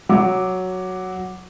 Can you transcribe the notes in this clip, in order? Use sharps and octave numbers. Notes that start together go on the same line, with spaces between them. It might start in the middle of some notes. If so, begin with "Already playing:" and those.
F#3 D6